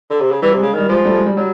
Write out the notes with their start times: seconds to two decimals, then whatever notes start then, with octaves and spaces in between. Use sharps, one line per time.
0.10 D3
0.21 C3
0.31 C#3
0.42 E3 G3
0.52 C3
0.57 G#3
0.63 C#3
0.73 D#3 G3
0.89 F3 G#3
1.04 G3 A3
1.15 G#3
1.26 G3
1.36 F#3 G3